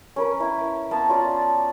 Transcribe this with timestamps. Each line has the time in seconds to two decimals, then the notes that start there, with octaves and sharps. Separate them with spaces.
0.16 C#4 A#4 B4
0.40 E4
0.91 B3 F5 A5 A#5
1.09 C#4 F4 D5